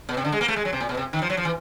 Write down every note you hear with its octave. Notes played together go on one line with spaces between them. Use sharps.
B2
C3
D3
G#3
A#3
A3
G#3
F#3
C3
A#2
B2
C3
D#3
F3
F#3
F3
E3